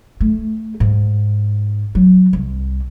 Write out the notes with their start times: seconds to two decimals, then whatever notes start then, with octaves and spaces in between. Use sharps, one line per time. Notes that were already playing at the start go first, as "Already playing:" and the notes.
0.20 A3
0.80 G#2
1.95 F#3
2.33 C2